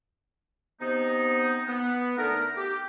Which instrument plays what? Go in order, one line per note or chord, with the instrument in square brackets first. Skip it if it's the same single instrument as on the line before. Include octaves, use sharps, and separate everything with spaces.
[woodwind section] C3 B3 D#4
B3
D3 A3 B3 D#4 A#4
G4